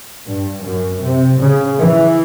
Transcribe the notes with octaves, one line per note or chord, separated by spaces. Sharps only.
G2
F#2
C3
C#3
E3